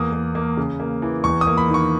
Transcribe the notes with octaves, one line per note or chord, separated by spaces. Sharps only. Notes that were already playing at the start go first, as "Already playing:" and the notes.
Already playing: E2 A#3 D#6
A#3
A#3
C#3
A#3
E3
E2 C#6
D#6
A#3
B5
D#3
C#6